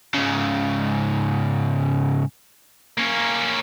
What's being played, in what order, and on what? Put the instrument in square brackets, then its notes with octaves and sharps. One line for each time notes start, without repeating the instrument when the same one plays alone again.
[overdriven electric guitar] G#2 C#3
[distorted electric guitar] A#3 C#4